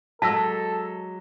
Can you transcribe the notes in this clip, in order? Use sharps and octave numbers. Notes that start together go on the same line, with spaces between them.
F#3 G#3 A4 A5 E6 A#6 B6